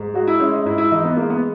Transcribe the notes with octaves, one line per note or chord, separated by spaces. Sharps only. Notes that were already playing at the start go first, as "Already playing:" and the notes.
Already playing: G#2
G#3 F#4
E4
G#3 C#4
D#4
G#2 E4
E4
E3 D#4
B3
G#3 A#3
B3